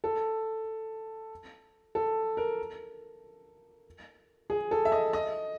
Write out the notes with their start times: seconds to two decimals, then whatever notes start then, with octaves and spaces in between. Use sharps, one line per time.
0.04 A4
1.95 A4
2.37 A#4
4.50 G#4
4.71 A4
4.85 E5
4.92 D#5
5.13 D#5